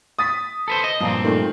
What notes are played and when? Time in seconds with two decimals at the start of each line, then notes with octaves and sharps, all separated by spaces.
0.19 D#6 A6 B6
0.68 A4 B4 C5
0.84 D#5
1.00 G2 A#2 F3 C4
1.25 D#3 A3